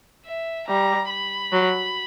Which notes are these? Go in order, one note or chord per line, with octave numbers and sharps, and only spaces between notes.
E5
G3 A#5
B5
F#3